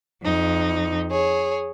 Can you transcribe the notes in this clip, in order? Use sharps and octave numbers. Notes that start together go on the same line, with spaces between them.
F2 D#4
G#4 C#5